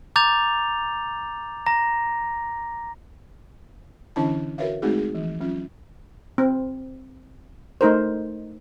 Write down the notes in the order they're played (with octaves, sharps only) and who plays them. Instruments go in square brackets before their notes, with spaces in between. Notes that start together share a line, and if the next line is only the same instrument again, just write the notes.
[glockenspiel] A#5 D6 G6 A6 F7
A#5 A#6
[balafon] D3 E3 C#4 D4 E4 A5
F#4 A#4 B4 C#5 E5 F5
G#3 A3 C4 D#4 F#4 G#4
G#4
E3 F3
F#3 C#4 F4
[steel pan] C4
A3 D#4 A#4 C5